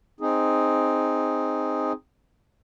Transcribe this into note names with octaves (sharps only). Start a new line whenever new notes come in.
C4 D#4 G#4